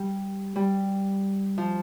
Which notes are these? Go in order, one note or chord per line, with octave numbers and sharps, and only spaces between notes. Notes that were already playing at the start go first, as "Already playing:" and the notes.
Already playing: G3
G3
F3